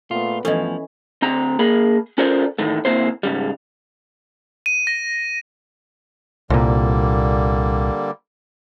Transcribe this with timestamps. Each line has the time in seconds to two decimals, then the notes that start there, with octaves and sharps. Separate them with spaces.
0.11 A#2 A3 B3 F4
0.45 G2 E3 F3 A3 B3 C#4 A4 D#5
1.22 D2 C4 A#5
1.59 A#3 G#4 A#4 B5
2.18 C#4 F4 A4 A#4 C5 D5
2.59 E2 A2 D#3 A3
2.85 D2 A#3 C4 E4 C5
3.23 G#2 C#3 G3
4.66 D#7
4.87 A#6
6.50 C2 A#2 D3 G3 A#3